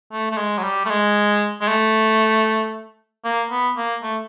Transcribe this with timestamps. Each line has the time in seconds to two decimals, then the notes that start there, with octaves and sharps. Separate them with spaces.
0.12 A3
0.31 A3
0.37 G#3
0.58 F#3
0.63 G3
0.86 A3
0.90 G#3
1.61 G#3
1.68 A3
3.25 A#3
3.51 B3
3.77 A#3
4.03 A3